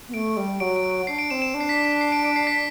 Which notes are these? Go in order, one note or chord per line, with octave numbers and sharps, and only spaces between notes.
B3
A3 D7
G3
F#3 D7
D7
D7
D4 C7
D7
C4 E7
E7
D4
C7
B6
B6
C7
D7
D7
C7
B6